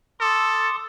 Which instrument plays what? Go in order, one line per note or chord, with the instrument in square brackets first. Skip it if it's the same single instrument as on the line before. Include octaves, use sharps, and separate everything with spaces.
[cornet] A4 [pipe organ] C6 D6 D#6